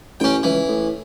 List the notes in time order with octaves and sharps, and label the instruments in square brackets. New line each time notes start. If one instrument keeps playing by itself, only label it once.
[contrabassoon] A1 [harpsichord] C#4 G5
[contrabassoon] C#2 [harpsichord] E3
[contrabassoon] A2